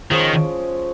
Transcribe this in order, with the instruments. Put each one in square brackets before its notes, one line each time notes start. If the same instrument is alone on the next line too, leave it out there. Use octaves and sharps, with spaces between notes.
[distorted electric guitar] D#3 [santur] F3 G#3 C#4